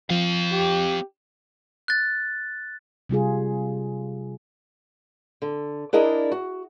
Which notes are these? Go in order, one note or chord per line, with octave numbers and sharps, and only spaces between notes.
F3 C4 F5
G4
F#6 A6
C3 G3 F4 G#4
D3
D4 E4 G#4 A#4 D5 D#5
F#4